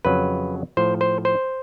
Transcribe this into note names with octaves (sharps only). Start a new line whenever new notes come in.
F2 C#3 F#3 B4
A2 F3 C5
C5
C5